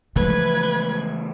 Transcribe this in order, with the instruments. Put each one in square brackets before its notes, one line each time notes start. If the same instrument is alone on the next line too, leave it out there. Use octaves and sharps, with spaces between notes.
[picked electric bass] C#3 E3 A3 [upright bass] F3 G#3 [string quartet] B4 G#6